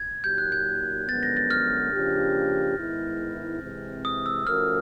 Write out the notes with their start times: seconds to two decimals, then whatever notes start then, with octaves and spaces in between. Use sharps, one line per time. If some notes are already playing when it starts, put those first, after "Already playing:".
Already playing: G#6
0.24 A#2 F#3 A#3 D#4 G4 G6
0.38 F#6
0.52 G6
1.08 F#2 D3 F3 G#3 B3 A6
1.23 A#6
1.37 A6
1.51 F6
1.93 C#3 F3 A#3 D4 G4
2.77 G#2 D#3 G#3 B3 E4
3.62 C3 E3 G#3 C4
4.05 D#6
4.26 E6
4.47 F3 A3 C#4 F#4 A#4 F6